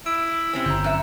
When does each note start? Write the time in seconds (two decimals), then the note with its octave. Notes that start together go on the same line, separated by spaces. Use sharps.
0.06 E4 E6 D7 E7
0.53 C3 C4 C#4 E6
0.66 G1 A#5 G6
0.84 F#2 E5 F#6